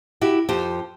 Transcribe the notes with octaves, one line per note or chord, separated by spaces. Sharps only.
E4 F#4 G4
F2 G4 C5